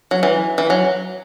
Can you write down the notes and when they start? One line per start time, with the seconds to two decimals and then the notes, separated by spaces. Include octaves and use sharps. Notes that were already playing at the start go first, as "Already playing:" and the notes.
0.11 F#3
0.23 E3
0.58 E3
0.70 F#3